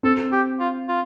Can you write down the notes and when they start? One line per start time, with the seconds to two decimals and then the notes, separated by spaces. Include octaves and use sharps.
0.03 C4 A4
0.32 G4
0.60 F4
0.88 F4